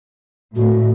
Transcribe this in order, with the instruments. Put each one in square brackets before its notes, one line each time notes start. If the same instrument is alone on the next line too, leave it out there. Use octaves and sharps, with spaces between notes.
[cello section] A2 [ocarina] F#4